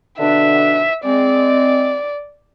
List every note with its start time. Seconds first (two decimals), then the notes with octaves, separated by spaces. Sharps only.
0.19 B2 D3 D4 E5
1.05 G#3 C4 D5